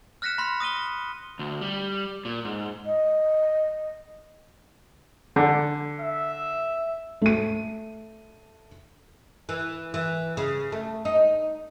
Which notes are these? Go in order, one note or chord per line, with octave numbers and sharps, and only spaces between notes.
F6 F#6 A#6 B6 C#7 E7
B5 C6 A#6
D#6 A#6 D#7 G7
D2
G3
A#2
G#2
D#5
D3
E5
A3 D#7
E3
E3
C#3
A3
D#4